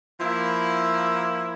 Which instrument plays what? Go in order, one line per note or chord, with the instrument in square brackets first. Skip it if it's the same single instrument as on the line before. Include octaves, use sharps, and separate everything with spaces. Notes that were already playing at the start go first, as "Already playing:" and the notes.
[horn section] F3 A#3 E4